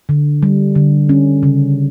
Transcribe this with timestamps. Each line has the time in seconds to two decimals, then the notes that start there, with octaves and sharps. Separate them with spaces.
0.09 D3
0.43 G3
0.75 D3
1.09 C#4
1.43 C#3